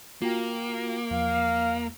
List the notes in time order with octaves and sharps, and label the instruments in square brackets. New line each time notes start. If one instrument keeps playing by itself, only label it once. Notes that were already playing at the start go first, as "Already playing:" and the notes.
[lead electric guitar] A#3 [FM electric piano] F4 F#4 G5
[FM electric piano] E2 F3 [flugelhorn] F5